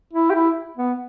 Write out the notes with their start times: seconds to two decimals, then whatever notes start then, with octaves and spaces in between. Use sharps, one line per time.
0.13 E4
0.30 G4
0.34 E4
0.77 B3